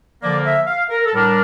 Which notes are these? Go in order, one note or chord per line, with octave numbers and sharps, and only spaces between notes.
D3 F3 A#3 D5
E5
F5
A#4
A4
A2 G3 D4 A#4